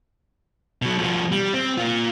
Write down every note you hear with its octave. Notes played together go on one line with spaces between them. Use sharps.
B2 F#3
B2 F3
G3
C4
A#3 F4